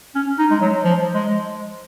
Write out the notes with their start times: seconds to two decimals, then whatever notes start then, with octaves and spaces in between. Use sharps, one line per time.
0.15 C#4
0.39 D#4
0.51 G#3
0.61 F#3
0.84 F3
1.14 G#3